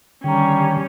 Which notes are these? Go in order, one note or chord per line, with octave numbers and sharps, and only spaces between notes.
D3 D#3 G3 C#4 G5 A#5